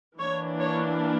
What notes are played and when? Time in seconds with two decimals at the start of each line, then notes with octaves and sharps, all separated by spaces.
0.18 E3 A#3 D4 C#5
0.59 C#5